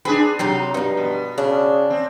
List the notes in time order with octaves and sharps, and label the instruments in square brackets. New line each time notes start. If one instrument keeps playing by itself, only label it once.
[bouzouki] C4 [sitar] D4 G#4 B4
[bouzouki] C3 C4 D#4 [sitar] F#3
[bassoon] G2 [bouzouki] F3 D#4
[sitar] B2
[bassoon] C#3 [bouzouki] D4
[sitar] C4